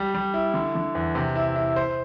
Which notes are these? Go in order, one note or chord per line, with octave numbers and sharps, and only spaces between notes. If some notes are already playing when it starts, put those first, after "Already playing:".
Already playing: G3
G3
E4
D3
D3
E2
C3
E4
E4
C5